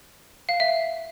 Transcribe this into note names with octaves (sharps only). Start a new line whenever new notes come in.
F5
E5